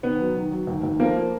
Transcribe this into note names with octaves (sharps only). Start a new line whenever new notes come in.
D#3 B3
F#3
D#3
F#3
D#2
D#2
F3 A#3
A#3